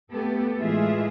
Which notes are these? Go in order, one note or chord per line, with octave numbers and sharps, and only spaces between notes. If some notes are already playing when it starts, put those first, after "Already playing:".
A3 B3 G4 A4
A2 E3 G#3 F4 G#4 E5